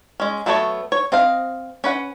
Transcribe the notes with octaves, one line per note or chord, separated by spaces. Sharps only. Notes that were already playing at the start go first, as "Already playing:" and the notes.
G#3 C#4
F#3 A3 B3 A4 C#5
C#5
C4 D#5 F5
C#4 B4 F#5